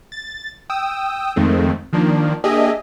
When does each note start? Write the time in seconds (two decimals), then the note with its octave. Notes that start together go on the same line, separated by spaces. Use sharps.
0.12 A6
0.70 G5 D#6 E6
1.36 F2 D#3 G#3 A3 C4
1.93 D#3 F3 A#3 D4
2.44 A#3 D4 G4 G#4 D#5 E5